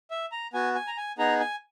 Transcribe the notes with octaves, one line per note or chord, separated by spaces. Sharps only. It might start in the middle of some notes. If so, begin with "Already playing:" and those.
E5
A#5
B3 F#4 G#5
G#5
A#5
G#5
B3 D#4 G#4 A#5
G#5